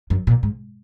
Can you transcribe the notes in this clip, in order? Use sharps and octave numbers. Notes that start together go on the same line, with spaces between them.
F#2
A#2
G#2